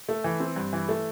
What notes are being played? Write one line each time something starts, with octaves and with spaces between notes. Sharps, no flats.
A3
E3
C4
G2
E3
A3